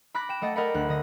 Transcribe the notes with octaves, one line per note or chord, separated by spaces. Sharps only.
B5 D6 F#6 A#6
G5 E7
A3 D#5 F#5 A6
A#4 D5 D#5 F#5 G5 B5
D2 F#6
D3 D#5